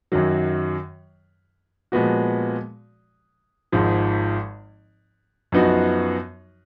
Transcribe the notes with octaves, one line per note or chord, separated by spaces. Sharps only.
F#2 D#3 F#3
A#2 F3 G#3 B3 F#4
G#1 G#2 F3
F#2 F3 B3 D#4 F#4